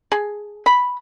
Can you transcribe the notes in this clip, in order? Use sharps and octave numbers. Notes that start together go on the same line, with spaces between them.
G#4
B5